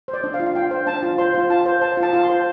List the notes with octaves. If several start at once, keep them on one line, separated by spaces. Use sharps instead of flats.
C5
D5
D4
F5
F4
F5
D4 G5
C5
D4 A5
F4
C5 C6
F4
F4 A5
C5
C5 A5
F4
A5
F4 A5
C6
C5